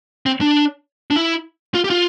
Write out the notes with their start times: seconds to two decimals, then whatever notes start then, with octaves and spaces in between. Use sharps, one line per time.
0.26 C4
0.41 D4
1.10 D4
1.16 E4
1.75 F4
1.84 G4
1.90 F4